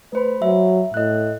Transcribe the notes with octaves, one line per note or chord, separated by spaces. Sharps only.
A3 B4 C5 B5
F#3 E5
A2 D#5 F#6